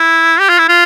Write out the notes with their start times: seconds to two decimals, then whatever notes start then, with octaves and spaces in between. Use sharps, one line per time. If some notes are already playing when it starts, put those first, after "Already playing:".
Already playing: E4
0.40 G4
0.49 F4
0.58 E4
0.68 F4